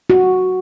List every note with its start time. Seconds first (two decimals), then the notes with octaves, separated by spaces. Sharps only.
0.10 F#4